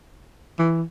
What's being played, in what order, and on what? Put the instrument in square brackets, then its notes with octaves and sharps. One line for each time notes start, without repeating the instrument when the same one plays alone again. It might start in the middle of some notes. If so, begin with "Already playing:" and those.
[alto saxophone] E3